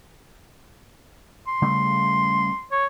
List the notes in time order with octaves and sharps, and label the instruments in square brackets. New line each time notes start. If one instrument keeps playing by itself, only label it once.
[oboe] C6
[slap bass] C#3 G3 A3
[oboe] C#5